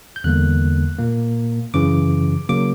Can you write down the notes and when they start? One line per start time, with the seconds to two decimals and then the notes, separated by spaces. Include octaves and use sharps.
0.16 G6
0.24 E2 D3 G3 A#3 F#6
0.99 A#2 A#3
1.74 F#2 C#3 E3 D6
2.49 C#3 F#3 A#3 D6